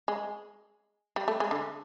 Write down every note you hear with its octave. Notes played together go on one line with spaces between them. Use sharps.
G#3
G3
A3
G#3
D3